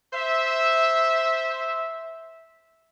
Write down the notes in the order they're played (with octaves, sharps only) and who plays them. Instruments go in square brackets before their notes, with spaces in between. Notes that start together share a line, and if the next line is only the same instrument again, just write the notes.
[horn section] C5 E5